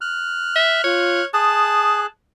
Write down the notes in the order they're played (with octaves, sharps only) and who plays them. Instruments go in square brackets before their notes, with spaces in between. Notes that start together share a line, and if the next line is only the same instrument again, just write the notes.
[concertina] F6 F#6
[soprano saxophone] E5
[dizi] F4 [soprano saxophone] C#5
[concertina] G#4 F#6 [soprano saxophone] A5 [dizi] D#6